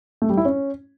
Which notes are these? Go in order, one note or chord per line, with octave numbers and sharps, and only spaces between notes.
A3
G3
E4
C#4